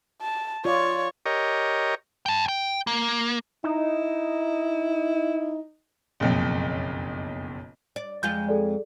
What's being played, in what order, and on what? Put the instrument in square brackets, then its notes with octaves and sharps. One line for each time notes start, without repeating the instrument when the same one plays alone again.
[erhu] A5
[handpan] F4 D5 [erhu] C#5
[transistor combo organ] G4 A#4 C#5 D#5
[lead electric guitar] G5 A5
G5
A#3
[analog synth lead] D#4 [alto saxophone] E4
[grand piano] F#1 B1 F2
[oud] D5
[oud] F2 G#3 F4 [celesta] G6 G7
[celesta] G#4 A4 D5